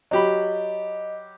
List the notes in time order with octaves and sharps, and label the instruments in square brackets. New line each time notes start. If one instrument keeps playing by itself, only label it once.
[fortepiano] F#3 G4 B5 [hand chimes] D#5